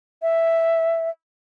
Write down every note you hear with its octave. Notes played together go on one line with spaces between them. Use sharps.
E5